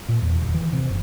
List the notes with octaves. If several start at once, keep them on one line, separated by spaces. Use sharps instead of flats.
A#2
E2
D#1
E3
C3
F#1